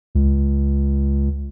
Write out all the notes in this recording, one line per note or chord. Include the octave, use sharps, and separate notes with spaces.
C#2